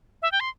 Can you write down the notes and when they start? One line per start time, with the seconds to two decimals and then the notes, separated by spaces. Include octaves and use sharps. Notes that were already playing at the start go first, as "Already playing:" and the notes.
0.22 E5
0.32 G5
0.40 C6